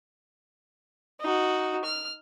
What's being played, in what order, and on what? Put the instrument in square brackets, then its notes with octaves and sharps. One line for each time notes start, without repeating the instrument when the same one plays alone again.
[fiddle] D#4 F#4
F6